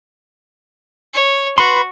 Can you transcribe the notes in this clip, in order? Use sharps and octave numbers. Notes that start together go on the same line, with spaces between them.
C#5
F#4 B4 B5 C6